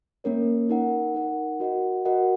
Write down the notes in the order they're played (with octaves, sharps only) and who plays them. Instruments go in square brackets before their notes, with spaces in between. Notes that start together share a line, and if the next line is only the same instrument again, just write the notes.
[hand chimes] A#3 C#4 A#4 C#5
D#4 A#4 F#5
D#4 A#4 F#5
F#4 A#4 D#5 F#5
F#4 A#4 D#5 F#5